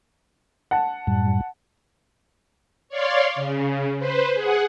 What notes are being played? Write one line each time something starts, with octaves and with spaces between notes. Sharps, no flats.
F#5 A5
F#2 A2 G3
C#5 D5 F5 C6
C#3
B4 C5
G#4 F#5